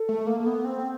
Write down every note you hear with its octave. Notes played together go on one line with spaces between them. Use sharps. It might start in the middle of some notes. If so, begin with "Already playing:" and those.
Already playing: A4
A3
A#3
A#3
B3
C4